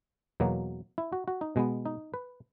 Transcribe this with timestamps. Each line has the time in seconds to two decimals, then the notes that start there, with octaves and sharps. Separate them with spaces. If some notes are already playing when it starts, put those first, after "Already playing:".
0.40 E2 B2 F#3 A#3
0.98 E4
1.13 F#4
1.28 F#4
1.41 D#4
1.56 B2 G#3 B3
1.85 D#4
2.14 B4